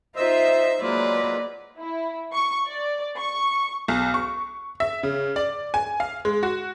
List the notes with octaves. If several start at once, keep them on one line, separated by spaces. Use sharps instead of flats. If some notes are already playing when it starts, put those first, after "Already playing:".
D#4 F4 C5 E5
F#3 G#3 A#3 F4 B4 D5
E4
C#6
D5
C#6
B1
C#6
E5
C#3
D5
G#5
F5
G#3
F#4